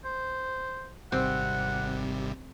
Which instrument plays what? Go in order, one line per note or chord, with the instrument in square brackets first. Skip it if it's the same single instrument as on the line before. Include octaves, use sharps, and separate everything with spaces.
[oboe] C5
[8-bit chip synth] G#1 C3 G3 [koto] C4 [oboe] F#5